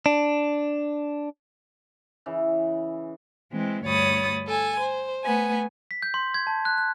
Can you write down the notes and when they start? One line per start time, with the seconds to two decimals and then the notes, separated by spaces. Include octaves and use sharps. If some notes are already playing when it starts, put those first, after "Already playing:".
0.06 D4
2.26 C#3 E3
3.53 E3 G#3 C4
3.86 D2 G2 C#5 B5 D#6 A6
4.48 A4 G#5
4.80 C5
5.25 A3 B3 G#5
5.91 B6
6.02 G6
6.14 C6
6.34 G#6
6.47 A5
6.65 F#6
6.78 F#6